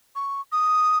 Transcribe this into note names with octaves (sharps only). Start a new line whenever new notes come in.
C#6
D#6